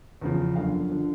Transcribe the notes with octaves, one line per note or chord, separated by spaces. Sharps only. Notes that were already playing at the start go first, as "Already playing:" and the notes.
E2 C#3 F3
F#2 D3 F3 F5
D3 F3